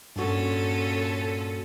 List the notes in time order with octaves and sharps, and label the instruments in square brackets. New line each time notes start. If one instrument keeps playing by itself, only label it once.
[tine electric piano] G2 F#4 [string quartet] A#2 C#4 A4